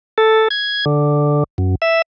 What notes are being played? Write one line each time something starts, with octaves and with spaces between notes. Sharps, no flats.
A4
G#6
D3
F#2
E5